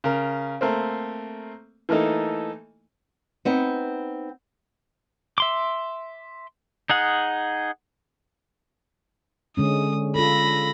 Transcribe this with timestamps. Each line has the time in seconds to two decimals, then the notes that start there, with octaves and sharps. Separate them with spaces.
0.04 C#3 A#4
0.61 A3 A#3 C4
1.89 E3 A3 A#3 D#4 A4
3.45 B3 C4 D#4
5.38 E5 C6 D6
6.90 D#4 G#4 F#5
9.57 D3 G#3 C#4 D#6
10.16 F4 A4 B5 A#6